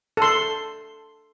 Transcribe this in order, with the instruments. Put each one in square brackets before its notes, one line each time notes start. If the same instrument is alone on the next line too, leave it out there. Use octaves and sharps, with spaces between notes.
[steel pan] A4 C6